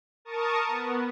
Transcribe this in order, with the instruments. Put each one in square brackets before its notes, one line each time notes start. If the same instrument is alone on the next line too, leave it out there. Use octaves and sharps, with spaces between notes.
[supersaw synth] A#4 A5 C#6 D#6
B3